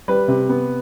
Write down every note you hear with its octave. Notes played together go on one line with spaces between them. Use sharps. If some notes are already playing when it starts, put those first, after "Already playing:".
G3 B4
C3
B3